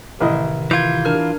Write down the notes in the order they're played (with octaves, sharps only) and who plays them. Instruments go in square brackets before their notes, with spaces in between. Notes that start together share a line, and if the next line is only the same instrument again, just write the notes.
[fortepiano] A1 E4 D#5 [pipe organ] C3 D#3
[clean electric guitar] E3 F4 [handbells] G6 G#6
[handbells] D4 A#4 F6